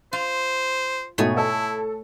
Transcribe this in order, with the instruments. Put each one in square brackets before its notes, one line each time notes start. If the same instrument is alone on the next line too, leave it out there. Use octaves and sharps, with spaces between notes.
[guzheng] F4 [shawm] C5
[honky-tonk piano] G#2 B2 [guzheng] A3 C#5 G#5
[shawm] E4 [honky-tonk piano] A4 A5